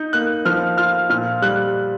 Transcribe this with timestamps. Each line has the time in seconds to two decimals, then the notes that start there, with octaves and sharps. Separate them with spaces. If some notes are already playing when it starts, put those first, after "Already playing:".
Already playing: D#4 G6
0.13 A#3 F#6
0.45 F3 F6
0.78 F4 F6
1.10 A#2 F6
1.42 G3 F#6